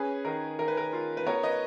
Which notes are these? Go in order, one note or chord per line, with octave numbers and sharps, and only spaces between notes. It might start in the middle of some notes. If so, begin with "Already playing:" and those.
Already playing: C#4 G#4 B4
D#3 A#4
D#3 A#4
B4
A#4
F4
B4
B3 A#4 C#5
B4 D#5